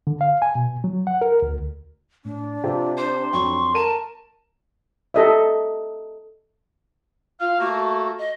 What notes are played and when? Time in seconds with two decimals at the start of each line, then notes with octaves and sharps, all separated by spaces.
0.07 D3
0.21 F5
0.42 G#5
0.55 B2
0.84 F#3
1.07 F#5
1.21 A#4
1.42 D2
2.25 A2 D4
2.64 C3 C4 F4
2.98 C5 C6
3.33 F2 F#3 C#6
3.74 A#4 A5 D#7
5.14 G4 A4 D#5 E5
7.40 F4 F5
7.59 A3 A#3 F#4
8.18 D#5